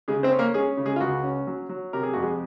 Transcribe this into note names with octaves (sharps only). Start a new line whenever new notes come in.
C#3 G#3 G#4
C4 C5
C#4
A#3 A#4
G#3 C#4 G#4
C#3
G#3 G#4
F4
C#2 F#4
C#4
F#3
F#3
C3 A#4
G#4
F2 F#4
G#3 G#4